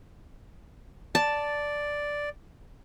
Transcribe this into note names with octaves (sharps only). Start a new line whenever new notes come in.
D5 A5